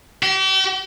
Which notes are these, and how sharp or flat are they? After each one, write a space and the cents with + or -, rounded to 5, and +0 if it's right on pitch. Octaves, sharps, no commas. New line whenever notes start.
G4 -40